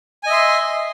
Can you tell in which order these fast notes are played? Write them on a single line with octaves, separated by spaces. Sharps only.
G#5 D#5 E5 C6